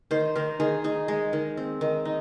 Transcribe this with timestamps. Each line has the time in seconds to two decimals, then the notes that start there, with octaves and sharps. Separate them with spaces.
0.11 D#3 C5
0.36 D#3 A#4
0.60 D#3 G#4
0.84 D#4 G#4
1.08 G#3
1.33 D#3
1.57 C4
1.81 D#3
2.05 D#4